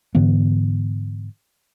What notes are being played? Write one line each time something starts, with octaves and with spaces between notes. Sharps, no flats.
G#2 D3 E3 B3